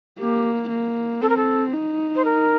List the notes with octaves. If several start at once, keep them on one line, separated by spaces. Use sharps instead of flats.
A#3 G4
A#3
C4 A4
A#4
A4
D#4
C5
A#4